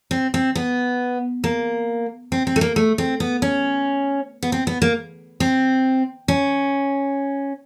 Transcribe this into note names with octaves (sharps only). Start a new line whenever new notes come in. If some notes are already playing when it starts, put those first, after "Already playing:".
C4
C4
B3
A#3
C4
C4
A3
A#3
A3
C4
B3
C#4
B3
C4
B3
A#3
C4
C#4